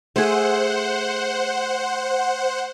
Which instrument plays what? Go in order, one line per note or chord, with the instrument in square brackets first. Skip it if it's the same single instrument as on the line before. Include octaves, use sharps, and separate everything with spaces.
[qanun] A3 G#4 [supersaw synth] C5 F#5